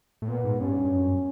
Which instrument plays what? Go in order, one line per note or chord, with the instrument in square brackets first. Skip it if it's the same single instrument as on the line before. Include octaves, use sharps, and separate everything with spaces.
[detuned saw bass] A2
[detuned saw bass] A#2 [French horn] B3
[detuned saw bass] G#2
[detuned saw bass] G2 [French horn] C#4
[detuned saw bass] G2
F#2